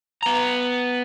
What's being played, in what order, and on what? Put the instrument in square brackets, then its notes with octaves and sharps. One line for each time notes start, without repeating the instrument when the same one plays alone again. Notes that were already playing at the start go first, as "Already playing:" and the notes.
[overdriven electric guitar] B3 A#5